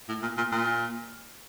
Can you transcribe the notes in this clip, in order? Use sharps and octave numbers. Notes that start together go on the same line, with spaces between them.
A2
A#2
A#2
A#2